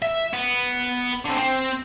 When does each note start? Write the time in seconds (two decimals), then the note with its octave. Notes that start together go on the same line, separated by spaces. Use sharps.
0.02 E5
0.33 B3
1.25 D3 C4
1.38 C4